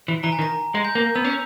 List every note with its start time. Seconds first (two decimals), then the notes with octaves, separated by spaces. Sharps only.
0.08 E3
0.23 E3 A#5
0.32 G#5
0.39 D#3
0.42 A#5
0.75 G#3
0.85 G6
0.95 A#3
1.15 B3 E6
1.24 C#4